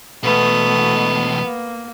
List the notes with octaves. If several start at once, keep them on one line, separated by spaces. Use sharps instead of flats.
E2 B2 A3 B3
A#3